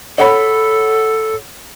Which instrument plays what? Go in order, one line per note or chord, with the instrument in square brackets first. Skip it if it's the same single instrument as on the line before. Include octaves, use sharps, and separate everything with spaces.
[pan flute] A4 [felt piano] C#5 F#5 B5